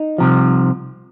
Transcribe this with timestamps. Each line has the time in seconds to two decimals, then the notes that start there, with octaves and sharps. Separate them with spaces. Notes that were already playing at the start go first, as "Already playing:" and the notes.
Already playing: D#4
0.18 C2 C3 F3